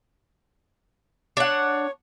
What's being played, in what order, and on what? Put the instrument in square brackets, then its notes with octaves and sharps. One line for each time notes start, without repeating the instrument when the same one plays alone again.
[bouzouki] D4 F#5 [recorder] C#5